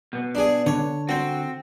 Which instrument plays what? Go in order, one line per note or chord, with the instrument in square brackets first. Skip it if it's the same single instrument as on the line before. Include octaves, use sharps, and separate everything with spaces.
[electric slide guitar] B2 B3
[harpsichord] D4 G#4
[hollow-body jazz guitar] D3 [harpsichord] C#5
[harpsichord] C4 [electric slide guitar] F#4